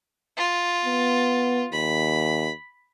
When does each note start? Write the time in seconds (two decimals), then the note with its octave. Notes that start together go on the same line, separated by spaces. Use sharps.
0.37 F4
0.85 B3
1.72 D#2 B5